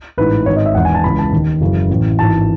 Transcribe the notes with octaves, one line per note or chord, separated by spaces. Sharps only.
A1 G#2 E3 B4
G#1 G#2 D#3 C#5
D#5
E5
E1 E2 D#3 F#5
G#5
A5
C#2 C#3 E3 B5
A5
D#2 D#3
F#1 F#2 C#3 E3
A1 A2 E3
G#1 G#2 E3 A5